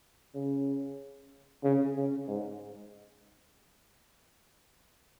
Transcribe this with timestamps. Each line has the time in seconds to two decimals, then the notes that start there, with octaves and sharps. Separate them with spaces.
0.35 C#3
1.64 C#3
1.95 C#3
2.28 G#2